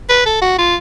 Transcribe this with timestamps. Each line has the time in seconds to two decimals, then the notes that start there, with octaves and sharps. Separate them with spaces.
0.09 B4
0.26 A4
0.42 F#4
0.58 F4